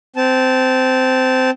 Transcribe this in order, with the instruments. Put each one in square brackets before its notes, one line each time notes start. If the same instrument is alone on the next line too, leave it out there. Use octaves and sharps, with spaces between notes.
[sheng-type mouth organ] C4 A5